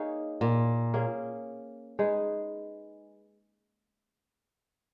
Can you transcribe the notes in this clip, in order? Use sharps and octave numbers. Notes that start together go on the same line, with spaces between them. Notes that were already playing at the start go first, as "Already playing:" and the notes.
Already playing: A#3 D#4 G#4 C#5
A#2
A#3 C#4 G#4
G#3 D#4 G#4 B4